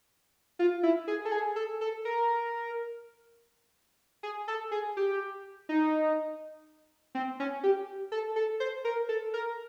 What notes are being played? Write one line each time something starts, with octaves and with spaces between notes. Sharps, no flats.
F4
E4
G#4
A4
G#4
A4
A4
A#4
G#4
A4
G#4
G4
D#4
C4
C#4
G4
A4
A4
C5
A#4
A4
A#4